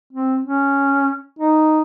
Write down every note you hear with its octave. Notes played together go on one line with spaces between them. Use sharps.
C4
C#4
D#4